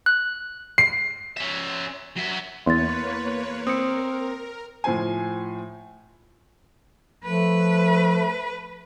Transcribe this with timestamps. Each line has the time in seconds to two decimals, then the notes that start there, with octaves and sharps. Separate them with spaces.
0.06 F#6
0.78 C7
1.37 C#4 E5
2.16 F#3 E5
2.66 E2 A#3 B4 C#5 C6 A6
3.67 C4 A#4 D#6 C#7
4.84 A2 F3 C5 G#5
7.24 F3 A3 B4